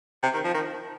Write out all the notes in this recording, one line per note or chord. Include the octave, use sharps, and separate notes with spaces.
C3
D#3
F3
D#3